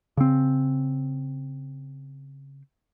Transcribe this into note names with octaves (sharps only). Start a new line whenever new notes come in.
C#3 C4